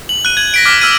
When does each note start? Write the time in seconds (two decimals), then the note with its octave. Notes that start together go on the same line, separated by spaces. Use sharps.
0.09 F#7
0.25 F#6 D#7
0.37 G#6 F#7
0.54 A#6 B6 D7
0.65 D6 F6 B6
0.81 E6 F6 G#6 D#7